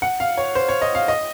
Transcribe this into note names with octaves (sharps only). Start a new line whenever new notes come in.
F#5
F5
C#5
C5
C#5
D#5
F5
D#5